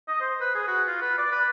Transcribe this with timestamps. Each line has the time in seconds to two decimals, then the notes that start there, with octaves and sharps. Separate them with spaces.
0.08 D#5
0.21 C5
0.40 B4
0.55 G#4
0.67 F#4
0.87 F4
1.01 B4
1.18 D5
1.31 B4